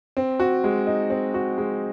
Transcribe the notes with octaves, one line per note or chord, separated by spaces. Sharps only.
C4
F#4
G#3
D#4
C4
F#4
G#3